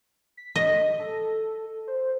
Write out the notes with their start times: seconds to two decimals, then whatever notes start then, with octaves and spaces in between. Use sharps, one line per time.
0.37 B6
0.56 D#5
0.99 A4
1.88 C5